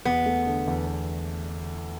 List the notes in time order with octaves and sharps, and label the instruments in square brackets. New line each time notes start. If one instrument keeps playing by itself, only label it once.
[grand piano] E2 [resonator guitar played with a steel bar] B3
[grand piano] A3
D3
E2